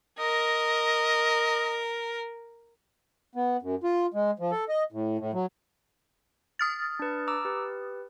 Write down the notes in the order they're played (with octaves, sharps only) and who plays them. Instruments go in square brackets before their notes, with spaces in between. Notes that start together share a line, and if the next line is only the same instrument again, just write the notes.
[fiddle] A#4 [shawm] D#5
[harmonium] B3
F#2
F4
G#3
F3
A4
D#5
A2
A2
F#3
[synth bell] D#6 F6 A6
[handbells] D4 B4
A#5 D6 E6
G4 B4